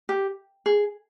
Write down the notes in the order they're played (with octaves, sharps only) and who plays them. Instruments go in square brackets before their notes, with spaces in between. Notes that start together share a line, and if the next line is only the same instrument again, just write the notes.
[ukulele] G4
G#4